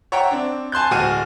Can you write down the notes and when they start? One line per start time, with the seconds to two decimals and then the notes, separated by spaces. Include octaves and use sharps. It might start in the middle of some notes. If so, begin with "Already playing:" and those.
0.12 C#5 E5 F#5 G5 A#5
0.31 C4 D4
0.72 G#5 A5 C6 F#6 G6
0.91 D1 G#3 F#4 G#4 F6 D#7